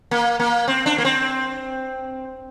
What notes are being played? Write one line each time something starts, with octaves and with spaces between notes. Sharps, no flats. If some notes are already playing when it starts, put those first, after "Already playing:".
A#3
A#3
C4
D4
A#3
C4